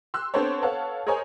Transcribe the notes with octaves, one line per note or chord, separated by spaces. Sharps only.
C6 E6 F#6
B3 C4 D4 A4 C5 C#5
A4 B4 C#5 F5 F#5 A5
G#4 A#4 C5 C#5 D#5 G#5